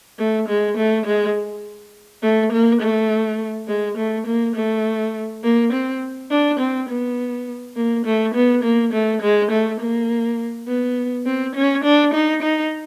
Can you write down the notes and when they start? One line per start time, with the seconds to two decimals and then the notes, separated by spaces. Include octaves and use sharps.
0.18 A3
0.48 G#3
0.77 A3
1.06 G#3
2.23 A3
2.52 A#3
2.81 A3
3.68 G#3
3.97 A3
4.26 A#3
4.55 A3
5.43 A#3
5.72 C4
6.31 D4
6.59 C4
6.89 B3
7.76 A#3
8.05 A3
8.34 B3
8.63 A#3
8.93 A3
9.21 G#3
9.51 A3
9.80 A#3
10.68 B3
11.26 C4
11.55 C#4
11.84 D4
12.13 D#4
12.42 D#4